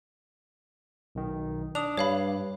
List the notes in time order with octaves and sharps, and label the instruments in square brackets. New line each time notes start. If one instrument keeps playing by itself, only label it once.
[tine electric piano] B1 D#3
[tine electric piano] D4 [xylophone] D#6 F7
[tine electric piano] G2 [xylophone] C#5 F5 B5